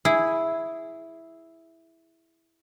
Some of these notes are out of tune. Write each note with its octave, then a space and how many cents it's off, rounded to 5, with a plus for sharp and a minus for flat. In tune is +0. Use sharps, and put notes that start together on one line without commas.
E4 +0 G#4 +0